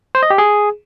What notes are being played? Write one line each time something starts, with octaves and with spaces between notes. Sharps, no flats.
C5
D#5
G4
G#4